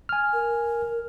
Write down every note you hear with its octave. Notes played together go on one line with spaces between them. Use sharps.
G#5 F6
A#4